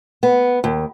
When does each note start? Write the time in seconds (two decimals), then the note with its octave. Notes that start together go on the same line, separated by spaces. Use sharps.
0.23 B3
0.64 D#2